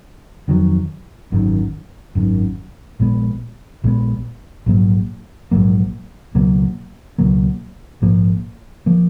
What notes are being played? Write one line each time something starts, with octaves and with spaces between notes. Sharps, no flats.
F2 D#3 F#3
G#1 F#2 D#3
G#1 F#2 D#3
A#1 A#2 G#3 B3
A#1 A#2 G#3 B3
A#1 G#2 F#3 A#3
A#1 G#2 F#3 A#3
C#2 B2 F#3 A#3
C#2 B2 F#3 A#3
A#1 G#2 F3 A#3
F3 A#3